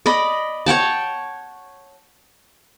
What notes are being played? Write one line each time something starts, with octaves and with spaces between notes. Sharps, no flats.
D5 D#5 B5
C#5 F#5 G5 A5